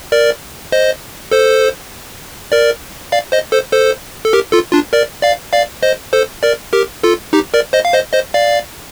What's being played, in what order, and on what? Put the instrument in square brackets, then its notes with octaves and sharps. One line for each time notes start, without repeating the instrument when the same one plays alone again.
[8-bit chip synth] A#4 D5
C5 D#5
A4 C5
A#4 D5
D5 F5
C5 D#5
A4 C5
A4 C5
A4
G4 A#4
F4 A4
D4 F4
A#4 D5
D5 F5
D5 F5
C5 D#5
A4 C5
A#4 D5
G4 A#4
F4 A4
D#4 G4
A#4 D5
C5 D#5
F5
C5 D#5
C5 D#5
D5 F5